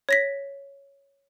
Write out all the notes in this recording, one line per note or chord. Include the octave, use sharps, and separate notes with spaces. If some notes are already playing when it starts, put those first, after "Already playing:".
C#5 A#6 B6